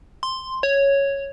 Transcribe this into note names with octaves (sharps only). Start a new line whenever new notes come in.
C6
C#5